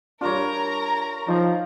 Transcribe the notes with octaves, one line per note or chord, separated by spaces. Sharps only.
G3 D4 F4 A#4 C#5 A#5
F3 D#4